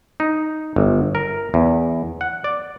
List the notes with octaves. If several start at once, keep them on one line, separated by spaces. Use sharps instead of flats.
D#4
G1
A#4
E2
F#5
D5